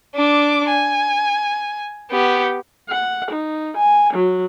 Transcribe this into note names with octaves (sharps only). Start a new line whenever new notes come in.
D4 D6
G#5
B3 G4
F#5
D#4
G#5
F#3